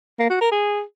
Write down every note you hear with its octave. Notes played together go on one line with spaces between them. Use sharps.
A#3
F#4
A#4
G#4